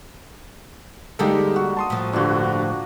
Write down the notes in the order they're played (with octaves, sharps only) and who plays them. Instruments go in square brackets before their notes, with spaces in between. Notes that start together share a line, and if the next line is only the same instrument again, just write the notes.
[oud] D3 G3 G#3 [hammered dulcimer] A#3 [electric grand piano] D#4 G4 A4
[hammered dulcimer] F#4
[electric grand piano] A5 C6 D#6
[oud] A2 F3
[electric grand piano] G2 D3 [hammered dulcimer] D4 F4 F#4